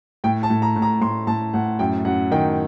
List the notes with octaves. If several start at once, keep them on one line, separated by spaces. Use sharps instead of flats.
A2 G5
A5
A2
A#5
A2
A#5
A2 C6
A2 A5
A2 F#5
F#2 G5
F#2 F#5
D#3 G5